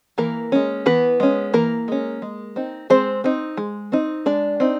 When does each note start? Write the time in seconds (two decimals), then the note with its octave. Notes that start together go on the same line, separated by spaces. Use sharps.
0.18 E3 A#3 A#4
0.52 G#3 C#4
0.86 E3 B3 B4
1.20 G#3 C#4
1.54 E3 A#3 A#4
1.88 G#3 C#4
2.22 G#3
2.56 C4 D#4
2.90 G#3 C4 C5
3.24 C4 D#4
3.57 G#3
3.92 C4 D#4
4.26 G#3 D4 D5
4.60 C4 D#4